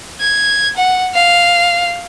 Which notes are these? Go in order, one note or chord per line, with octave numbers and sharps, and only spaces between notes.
G#6
F#5
F5